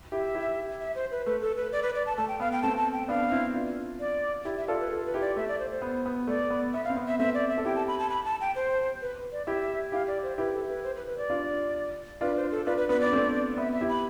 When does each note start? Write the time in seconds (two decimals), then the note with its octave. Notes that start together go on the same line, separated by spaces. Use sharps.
0.12 E4 G4 E5
0.34 E4 G4
0.81 E5
0.95 C5
1.11 B4
1.26 A3 B4
1.42 A4
1.57 B4
1.72 D5
1.83 B4
1.95 D5
2.06 A5
2.17 A3 A5
2.28 G5
2.40 B3 F5
2.52 G5
2.62 A3 C4 A5
2.78 A5
2.93 G5
3.08 B3 D4 F5
3.31 C4 E4
3.54 D4 F4
4.00 D5
4.45 E4 G4
4.57 E5
4.68 F4 A4 D5
4.80 B4
4.91 A4
5.06 B4
5.14 E4 G4
5.21 D5
5.36 A3 E5
5.48 D5
5.59 C5
5.70 C5
5.82 B3
6.06 B3
6.27 A3 D5
6.50 B3
6.74 B3 E5
6.85 F5
6.90 C4
6.97 B3
7.08 E5
7.19 A3 C4 E5
7.34 D5
7.49 E5
7.58 A4
7.65 E4 G4 G5
7.76 A5
7.87 B5
7.99 A5
8.10 B5
8.25 A5
8.41 G5
8.56 C5
9.02 B4
9.32 D5
9.47 E4 G4 E5
9.92 E4 G4 F5
10.08 D5
10.23 C5
10.38 E4 G4 B4
10.54 A4
10.69 B4
10.84 C5
10.96 B4
11.07 B4
11.18 D5
11.30 D4 F4
12.21 D4 F4 B4
12.36 C5
12.51 A4
12.66 D4 F4 B4
12.77 B4
12.89 B3 D4 B4
13.01 D4 D5
13.13 A3 C4
13.57 B3 E5
13.73 E5
13.81 E4 G4
13.89 B5